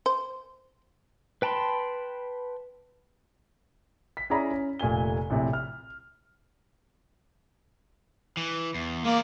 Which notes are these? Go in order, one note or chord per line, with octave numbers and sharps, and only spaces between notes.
C5
B4 G5 A5 B5 C6
B6
C#4 E4 G#4 D5 A#5 B5
C#4
F1 A#2 A3 G#5 G7
A#1 A2 C3
F6
E3
E2
G#3 A#3 D5